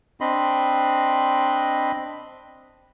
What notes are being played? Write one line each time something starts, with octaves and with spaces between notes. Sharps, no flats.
C4 D4 D#5 B5 C6